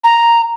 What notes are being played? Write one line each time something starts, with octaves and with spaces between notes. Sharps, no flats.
A#5